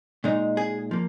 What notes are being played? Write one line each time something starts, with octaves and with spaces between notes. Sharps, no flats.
A#2 G#3 D#4
G#4
F3 A#3